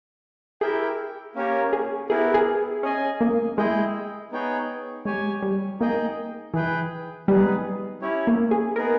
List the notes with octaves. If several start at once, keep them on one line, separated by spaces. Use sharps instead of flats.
E4 G4 G#4 A#4 E5 G5
A#3 C#4 G4 A#4 C#5
G#4
B3 E4 G4 G#4 A#4
G#4
C#4 G#4 D#5 G#5
A#3
G#3 E4 G#4 D#5 G5
B3 D#4 G#4 C#5 G5
G#3 G4 C#5 G#5
G3
A#3 D#4 G#4 D#5 G5
E3 G#4 B4 G5
G3 B3 D#4 G#4 B4
C#4 E4 G4 C#5
A#3
G#4
B3 D#4 G#4 A#4